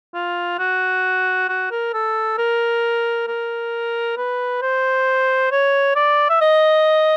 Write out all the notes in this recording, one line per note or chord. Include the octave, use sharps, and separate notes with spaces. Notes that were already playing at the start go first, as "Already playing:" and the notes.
F4
F#4
F#4
A#4
A4
A#4
A#4
B4
C5
C#5
D5
E5
D#5